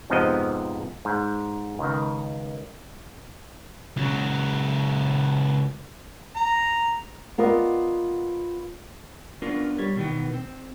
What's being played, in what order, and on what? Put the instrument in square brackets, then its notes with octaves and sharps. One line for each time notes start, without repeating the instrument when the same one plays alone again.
[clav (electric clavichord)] F2 G#2 C3 F3 B3 D#5
G#2
C#2 D#3
[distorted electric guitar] C#2 F#3
[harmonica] A#5
[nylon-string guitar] B3 F4 A#4 D5 D#5
[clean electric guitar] B3 C#4 D4 F4 A#4
G3 C#5
B2 D#3 E3 B3
C4